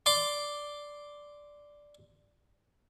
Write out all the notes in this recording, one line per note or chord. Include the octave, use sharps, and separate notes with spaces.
D5 C6 D6